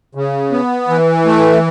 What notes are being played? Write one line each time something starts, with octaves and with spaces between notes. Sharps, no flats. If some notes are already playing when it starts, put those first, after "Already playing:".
C#3
B3
E3
A3